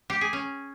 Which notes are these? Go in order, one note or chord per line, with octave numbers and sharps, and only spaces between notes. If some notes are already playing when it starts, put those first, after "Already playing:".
G4
G#4
C#4